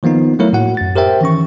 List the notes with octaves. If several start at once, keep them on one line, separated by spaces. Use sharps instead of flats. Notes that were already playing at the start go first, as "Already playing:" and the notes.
D#3 F3 A#3 B3 D#4
F#3 A3 A#3 E4 A#4 C#5
A2 F#4 F#5
F#2 A6
G4 A#4 C5 E5 G5
D#3 E3 C#4 C#6